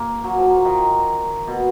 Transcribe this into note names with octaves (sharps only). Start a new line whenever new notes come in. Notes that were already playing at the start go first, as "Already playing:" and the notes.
Already playing: A#3
F#3
F3
F3
D#3
B2